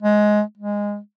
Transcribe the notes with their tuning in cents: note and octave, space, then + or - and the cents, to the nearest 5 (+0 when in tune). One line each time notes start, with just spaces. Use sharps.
G#3 +15
G#3 -15